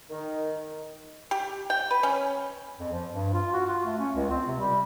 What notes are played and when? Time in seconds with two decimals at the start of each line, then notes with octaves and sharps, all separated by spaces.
0.10 D#3
1.31 G4
1.70 G5
1.91 B4
2.03 C#4
2.80 F2
2.92 F3
3.10 G2
3.34 F4
3.53 F#4
3.66 F4
3.85 A3
3.99 C#4
4.15 C#2
4.30 C4
4.47 C3
4.60 G3